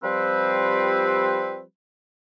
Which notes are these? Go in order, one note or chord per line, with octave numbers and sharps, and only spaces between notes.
F3 G3 C4 B4